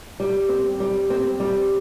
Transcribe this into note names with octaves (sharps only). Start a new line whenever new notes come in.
G3
C4
G3
C4
G3